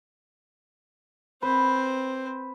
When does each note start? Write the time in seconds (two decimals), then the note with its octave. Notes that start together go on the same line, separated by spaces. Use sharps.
1.42 C4 B4 C5